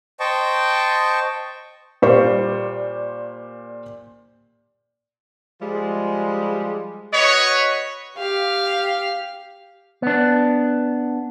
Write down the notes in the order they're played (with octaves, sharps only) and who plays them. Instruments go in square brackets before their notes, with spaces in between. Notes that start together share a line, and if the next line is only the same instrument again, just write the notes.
[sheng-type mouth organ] C5 D#5 G5 A5 C#6
[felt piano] A#2 G3 C5 F5 C#6
[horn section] F3 G3 G#3
[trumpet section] F#4 B4 C#5 [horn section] D#5
[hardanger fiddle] G4 F5
[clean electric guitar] B3 D4